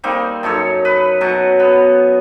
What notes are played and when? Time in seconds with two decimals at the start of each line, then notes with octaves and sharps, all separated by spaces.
0.04 G3 A#3 C4 D#4
0.43 F#2 D#4 A4 C#5
0.85 B4
1.21 B2 F#3 F#4
1.60 B3